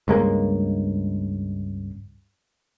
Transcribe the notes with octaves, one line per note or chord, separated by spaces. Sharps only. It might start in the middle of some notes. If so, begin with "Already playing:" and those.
C#2 G2 G#3 A#3